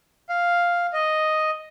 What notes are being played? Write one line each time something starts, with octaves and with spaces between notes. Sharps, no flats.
F5
D#5